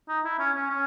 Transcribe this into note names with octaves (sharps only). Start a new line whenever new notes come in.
D#4
E4
C#4
C#4
C#4